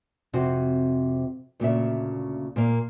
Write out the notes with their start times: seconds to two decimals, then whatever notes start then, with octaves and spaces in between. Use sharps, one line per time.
0.33 F2 C3 C4 F#4
1.60 D2 A#2 C#3 E5
2.56 A#2 A#3